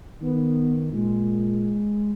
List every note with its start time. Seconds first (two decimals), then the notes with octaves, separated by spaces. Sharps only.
0.21 D#3 B3
0.92 A#2 G#3